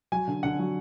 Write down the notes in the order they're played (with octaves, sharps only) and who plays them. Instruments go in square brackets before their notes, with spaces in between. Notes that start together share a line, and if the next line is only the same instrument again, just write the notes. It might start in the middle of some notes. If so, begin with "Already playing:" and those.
[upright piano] F#3 [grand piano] G#5
[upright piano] D3
[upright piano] D3 [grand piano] F#5
[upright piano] F#3